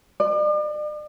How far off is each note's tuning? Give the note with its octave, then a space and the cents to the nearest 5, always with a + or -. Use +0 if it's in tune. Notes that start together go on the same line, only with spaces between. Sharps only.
D5 +40